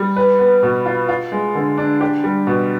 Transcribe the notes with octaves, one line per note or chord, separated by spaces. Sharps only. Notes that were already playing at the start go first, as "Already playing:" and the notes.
Already playing: G3
B4
B3
B2
F4
F4
G#3
D3
D4
G4
G3
B2